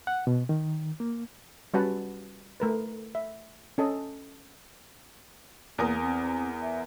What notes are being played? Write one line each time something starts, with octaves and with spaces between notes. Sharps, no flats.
F#5
B2
D#3
A#3
G3 C#4 F#4 B4 F#5 A5
A3 A#4 B4
E5
C#4 A4 D#5
E2 A#3 A#4 D#6
C4
E5